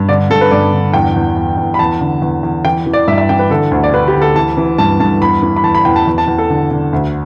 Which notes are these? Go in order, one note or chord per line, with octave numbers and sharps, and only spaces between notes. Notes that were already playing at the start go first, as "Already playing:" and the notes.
Already playing: G2
D3 D5
G2 A4
B4
G2 D5
D3
E2 G5
E2
E2
E2
B5
E2 A5
D3
E2
E2
E3 G5
E3
D5
G2 E5
E5
E3 G5
B4
D3 A4
D2
D5
D3 B4
G4
D2
A4
E3 A5
E3
G2 A5
G2 A5
E2 B5
E3
B5
E2 A5
B5
E2 G5
A5
E2
A5
E2
A4
D3
D3
D2